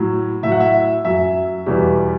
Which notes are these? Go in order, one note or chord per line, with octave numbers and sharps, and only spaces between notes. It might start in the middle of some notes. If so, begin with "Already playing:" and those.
Already playing: A2 F#3
A2 F#3 E5
F#5
E5
F#2 F#3 E5
E2 B2 G3